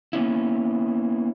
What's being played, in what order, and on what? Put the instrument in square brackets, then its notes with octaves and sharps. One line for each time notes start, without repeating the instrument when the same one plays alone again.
[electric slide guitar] A#3 B3 C#4 E4